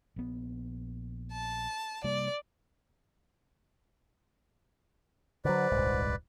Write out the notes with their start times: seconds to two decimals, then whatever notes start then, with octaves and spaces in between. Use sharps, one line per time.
0.16 A#1 B3
1.32 A5
2.04 C3 G3 A#3 D5
5.45 D3 F#3 B4 C5 D5
5.72 D#1 C2 G#2